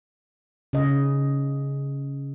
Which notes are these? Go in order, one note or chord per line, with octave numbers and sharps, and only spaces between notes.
C#3 D#5